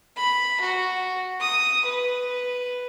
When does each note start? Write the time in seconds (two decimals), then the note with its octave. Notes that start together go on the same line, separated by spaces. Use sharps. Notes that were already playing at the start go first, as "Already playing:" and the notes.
0.17 B5
0.60 F#4
1.40 D#6
1.85 B4